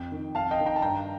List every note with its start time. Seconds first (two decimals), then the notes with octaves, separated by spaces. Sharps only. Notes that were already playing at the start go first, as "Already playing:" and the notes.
Already playing: F2 G5
0.12 D#3
0.35 F2 F5 A5
0.51 D#5 G5
0.59 D#3
0.66 G5 A#5
0.76 A5
0.82 G2 G5 A#5